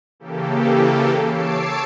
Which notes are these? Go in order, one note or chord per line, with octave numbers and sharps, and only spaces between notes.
C#3 E3 A#3 G4 A4
C#5 A5 D6 E6 C7 D7